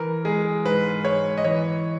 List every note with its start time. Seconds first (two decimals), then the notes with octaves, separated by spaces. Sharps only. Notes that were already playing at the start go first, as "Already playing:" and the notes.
Already playing: E3 A#4
0.25 G#3 G#4
0.65 G#2 B4
1.04 G#2 C#5
1.38 D#5
1.44 E3 C#5